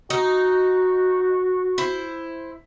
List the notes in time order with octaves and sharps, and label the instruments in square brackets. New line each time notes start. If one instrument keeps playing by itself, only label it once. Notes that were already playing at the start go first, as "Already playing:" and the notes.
[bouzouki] D#4 [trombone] F#4
[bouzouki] E4 C5